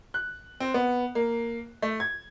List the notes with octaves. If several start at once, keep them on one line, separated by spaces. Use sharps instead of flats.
F#6
C4
B3
A#3
A3
G#6